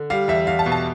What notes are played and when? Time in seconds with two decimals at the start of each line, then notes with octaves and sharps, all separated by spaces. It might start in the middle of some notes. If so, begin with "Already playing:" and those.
Already playing: D3
0.10 G3 F5
0.28 E2 E5
0.47 E2 F5
0.59 A5
0.66 B2
0.72 A5